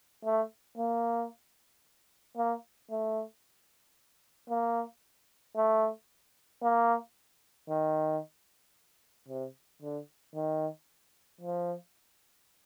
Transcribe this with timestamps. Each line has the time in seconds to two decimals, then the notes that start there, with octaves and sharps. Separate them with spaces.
0.25 A3
0.78 A#3
2.37 A#3
2.91 A3
4.50 A#3
5.56 A3
6.63 A#3
7.69 D#3
9.28 C3
9.82 D3
10.35 D#3
11.41 F3